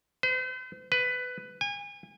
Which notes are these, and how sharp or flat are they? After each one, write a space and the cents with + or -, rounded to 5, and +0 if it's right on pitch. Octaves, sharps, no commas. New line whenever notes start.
C5 -40
B4 +15
G#5 -35